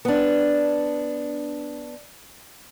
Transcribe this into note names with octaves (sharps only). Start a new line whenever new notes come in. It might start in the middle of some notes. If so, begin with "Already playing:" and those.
B3 D4